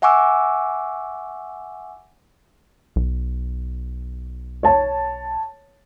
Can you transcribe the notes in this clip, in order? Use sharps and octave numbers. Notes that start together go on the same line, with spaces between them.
E5 F#5 G#5 C#6 D6 E6
B1
C#5 A5